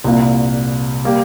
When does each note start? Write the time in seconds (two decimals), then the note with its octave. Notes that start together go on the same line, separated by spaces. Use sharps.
0.04 C2 A#2 A#3
1.04 G3 A#3 G4